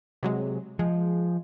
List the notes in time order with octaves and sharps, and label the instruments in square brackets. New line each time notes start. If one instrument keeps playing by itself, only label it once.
[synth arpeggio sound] C3 F#3 G#3
[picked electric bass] F3 [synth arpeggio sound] G#3